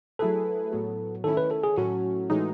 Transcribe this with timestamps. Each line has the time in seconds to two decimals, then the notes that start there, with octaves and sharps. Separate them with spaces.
0.19 F#3 A3 E4 G#4 A4 B4
0.72 A2 F#3 B3
1.24 D#3 A3 C#4 E4 A4
1.37 B4
1.51 A4
1.64 G#4
1.77 A2 F#3 A3 C#4 F#4
2.30 A2 E3 G#3 D#4